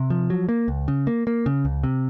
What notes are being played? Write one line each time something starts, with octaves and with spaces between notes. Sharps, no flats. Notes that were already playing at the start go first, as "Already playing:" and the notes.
Already playing: C3
F3
F#3
A#3
C#2
C#3
A#3
A#3
C#3
C#2
C3